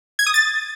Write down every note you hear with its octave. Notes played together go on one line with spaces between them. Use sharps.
G#6
D#6
A6